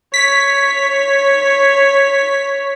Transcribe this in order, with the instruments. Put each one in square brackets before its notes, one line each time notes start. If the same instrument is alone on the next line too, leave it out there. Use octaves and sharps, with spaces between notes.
[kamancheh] C#5 [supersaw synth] B6